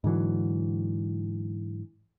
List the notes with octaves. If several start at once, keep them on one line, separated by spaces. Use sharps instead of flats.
G#2 D3 E3 F#3